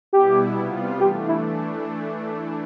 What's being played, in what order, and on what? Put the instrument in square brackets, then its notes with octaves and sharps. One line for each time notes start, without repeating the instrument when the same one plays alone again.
[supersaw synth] B2 G3 B3 E4 [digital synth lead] G4
[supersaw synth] C3 G3 B3 F4
[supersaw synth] E3 A3 D4 [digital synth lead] G4
[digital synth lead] E4